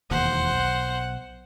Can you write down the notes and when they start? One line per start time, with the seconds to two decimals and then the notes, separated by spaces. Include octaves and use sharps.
0.11 E1 D#2 C5 F#5
0.52 B1